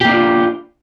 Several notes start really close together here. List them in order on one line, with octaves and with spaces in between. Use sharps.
G4 A#3 D4 F4